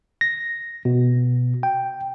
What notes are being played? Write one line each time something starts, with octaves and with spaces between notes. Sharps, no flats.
A#6
B2
G5